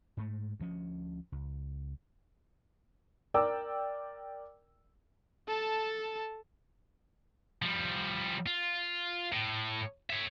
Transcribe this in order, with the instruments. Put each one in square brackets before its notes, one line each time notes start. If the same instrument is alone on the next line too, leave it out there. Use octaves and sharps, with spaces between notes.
[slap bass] G#2 A3
D2 F3 C#4
C#2
[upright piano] A#4 D5 G5 D6 E6
[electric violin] A4 A5
[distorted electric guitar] F3 G3
F4
A2
C#5 E5